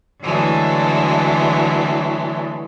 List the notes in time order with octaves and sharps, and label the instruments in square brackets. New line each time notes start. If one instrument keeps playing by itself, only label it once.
[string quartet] D3 E3 F#3 G#3 A3